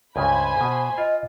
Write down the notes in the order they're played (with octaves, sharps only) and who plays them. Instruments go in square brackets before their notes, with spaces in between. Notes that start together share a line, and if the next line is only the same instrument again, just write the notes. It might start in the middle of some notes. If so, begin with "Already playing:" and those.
[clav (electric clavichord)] C#2 G2 C#3 [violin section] C5 G#5 B5
[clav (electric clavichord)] B2
[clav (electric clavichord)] F4 [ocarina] D#5